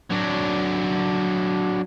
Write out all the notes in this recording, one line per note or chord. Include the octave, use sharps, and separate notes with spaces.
F#3 D4